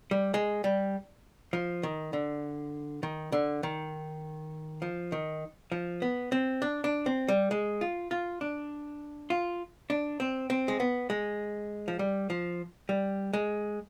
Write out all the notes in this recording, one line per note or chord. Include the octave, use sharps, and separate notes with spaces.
G3
G#3
G3
F3
D#3
D3
D#3
D3
D#3
F3
D#3
F3
B3
C4
D4
D4
C4
G3
G#3
F4
F4
D4
F4
D4
C4
C4
G#3
B3
G#3
F3
G3
F3
G3
G#3